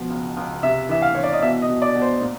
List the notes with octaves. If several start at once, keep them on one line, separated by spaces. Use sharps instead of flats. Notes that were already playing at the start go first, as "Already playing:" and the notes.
Already playing: B2 F3
C#2
C#2
C3 E5
E3 E5
F5
E3 C#5
D5
D#5
B2 E5
D#5
B2
D5
B2
C5
A#2